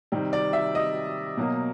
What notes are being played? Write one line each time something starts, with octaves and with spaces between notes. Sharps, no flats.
C3 D#3 G3
D5
E5
D#5
B2 F#3 A#3